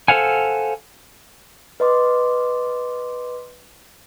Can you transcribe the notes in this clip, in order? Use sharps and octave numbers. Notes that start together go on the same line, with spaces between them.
A4 A#4 C5 F5 F#5 G#5
B4 D#5 C6 D6